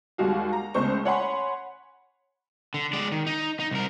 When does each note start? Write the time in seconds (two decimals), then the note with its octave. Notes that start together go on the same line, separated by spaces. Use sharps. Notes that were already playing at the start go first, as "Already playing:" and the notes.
0.18 D#2 G3 G#3 F#4 F5
0.53 A#5
0.74 F#1 C#2 A3 C5 C#6
1.05 C#5 F#5 G#5 B5 C6
2.74 D3
2.93 G#3 D5
3.12 D#3
3.27 D#4
3.60 D#4
3.71 C2 A#4